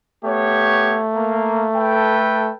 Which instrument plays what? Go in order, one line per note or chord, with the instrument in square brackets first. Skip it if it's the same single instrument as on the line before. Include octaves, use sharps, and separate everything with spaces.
[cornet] A3 [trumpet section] B3 G4 C#5
[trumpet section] A#3
A4 B4 G5